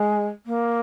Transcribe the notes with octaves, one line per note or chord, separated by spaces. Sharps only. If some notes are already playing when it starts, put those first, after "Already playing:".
Already playing: G#3
A#3